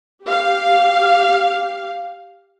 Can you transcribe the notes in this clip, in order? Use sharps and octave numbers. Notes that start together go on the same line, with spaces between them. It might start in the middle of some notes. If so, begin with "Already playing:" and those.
G4 F5